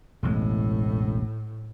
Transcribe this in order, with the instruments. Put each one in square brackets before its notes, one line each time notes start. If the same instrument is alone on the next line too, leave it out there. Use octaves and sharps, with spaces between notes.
[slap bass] E1 A1 G#3 [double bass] A2